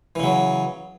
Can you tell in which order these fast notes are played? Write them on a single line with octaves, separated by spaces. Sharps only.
E3 C#3 F#3